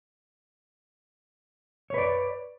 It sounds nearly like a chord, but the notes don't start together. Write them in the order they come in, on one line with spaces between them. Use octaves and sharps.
C#5 B4 D5